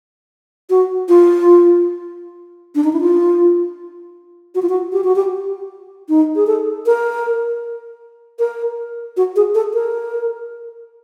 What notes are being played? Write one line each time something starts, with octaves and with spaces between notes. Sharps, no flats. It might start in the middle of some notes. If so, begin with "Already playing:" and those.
F#4
F4
D4
D#4
E4
F4
F#4
F4
F#4
G4
F#4
G4
D#4
G#4
A4
A#4
A#4
F#4
G#4
A4
A#4